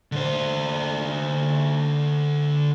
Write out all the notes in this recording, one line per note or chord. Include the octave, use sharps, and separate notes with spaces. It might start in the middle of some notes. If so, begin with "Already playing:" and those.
D3 C5